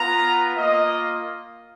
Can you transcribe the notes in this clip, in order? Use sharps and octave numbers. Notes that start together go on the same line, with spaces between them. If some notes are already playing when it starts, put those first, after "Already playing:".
Already playing: B3 F4 A#5
A#3 F4 D#5